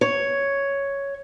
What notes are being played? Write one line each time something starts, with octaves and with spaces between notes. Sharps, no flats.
C#5